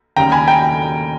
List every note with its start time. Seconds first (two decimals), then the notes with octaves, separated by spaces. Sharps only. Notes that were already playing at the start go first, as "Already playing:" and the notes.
0.16 D#2 C#3 G3 G5 A#5
0.32 G#5 B5
0.47 G5 A#5